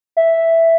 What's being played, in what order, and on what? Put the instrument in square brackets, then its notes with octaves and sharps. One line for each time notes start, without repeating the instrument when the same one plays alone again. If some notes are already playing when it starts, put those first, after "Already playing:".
[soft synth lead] E5